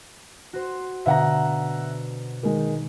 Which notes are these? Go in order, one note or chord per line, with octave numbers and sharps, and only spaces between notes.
F#4 C5
B2 D3 E5 F#5 A#5
D#3 G#3